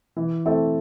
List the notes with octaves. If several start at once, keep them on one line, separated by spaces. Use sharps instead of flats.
E3
A3 C4 E4 A4